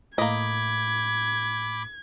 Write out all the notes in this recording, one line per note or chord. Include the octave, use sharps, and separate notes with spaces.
A2 A#3 D#5 B5 D6 G#6